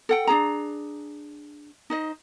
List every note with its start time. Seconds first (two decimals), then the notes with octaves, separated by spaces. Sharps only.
0.09 A4 F#5 G5
0.27 D4 D#4 G#4 A#5
1.90 D#4 C5 D#5